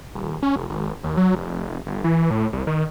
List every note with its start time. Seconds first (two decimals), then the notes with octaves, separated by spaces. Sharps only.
0.15 D#1
0.42 C#4
0.56 F1
0.70 G#1
1.04 D#2
1.17 F#3
1.35 F1
1.87 G1
2.04 E3
2.30 A2
2.53 C2
2.67 D#3